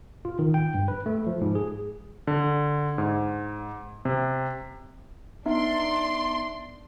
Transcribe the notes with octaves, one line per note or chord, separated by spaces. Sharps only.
F4
D#3
G5
G2
B4
A3
F3
G#2
G#4
D3
G#2
C3
B3 D4 D#4 E5 C6